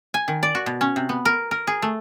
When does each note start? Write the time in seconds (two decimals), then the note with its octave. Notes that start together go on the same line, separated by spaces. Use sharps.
0.14 G#5
0.28 D#3
0.43 D5
0.55 F#4
0.66 B2
0.81 C#4
0.96 C3
1.09 B3
1.25 A#4
1.51 A#4
1.67 G#4
1.82 A3